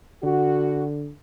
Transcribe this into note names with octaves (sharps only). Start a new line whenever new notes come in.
D3 F#4